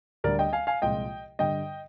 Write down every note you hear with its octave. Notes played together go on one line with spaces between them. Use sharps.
D2 D3 G3 A#4 D5
D#5 G5
F5 G#5
F5 G#5
C2 A#2 F3 G#3 D#5 G5
G2 D3 G3 D#5 G5